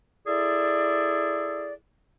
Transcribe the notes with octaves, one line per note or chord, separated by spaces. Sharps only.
E4 G#4 A4 D5